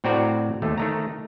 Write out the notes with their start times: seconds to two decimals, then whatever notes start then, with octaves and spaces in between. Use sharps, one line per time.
0.04 A2 C4 F#4 D5 A#5
0.62 D#2 A3
0.78 D#3 A3 A#5